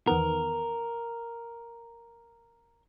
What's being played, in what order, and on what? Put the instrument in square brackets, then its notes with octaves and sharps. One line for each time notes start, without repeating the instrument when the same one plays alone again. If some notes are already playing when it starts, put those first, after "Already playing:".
[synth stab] E2 D#3 B3 [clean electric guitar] A#4